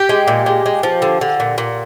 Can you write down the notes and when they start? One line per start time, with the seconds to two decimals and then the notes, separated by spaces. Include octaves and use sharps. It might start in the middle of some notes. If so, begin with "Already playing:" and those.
Already playing: G4
0.09 G#3
0.28 A#2
0.46 G#3
0.66 G#3
0.83 F3
1.02 D3
1.21 D3
1.40 A#2
1.58 A#2